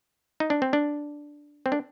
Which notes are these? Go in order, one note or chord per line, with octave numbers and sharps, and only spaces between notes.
D#4
D4
C4
D4
C4
D4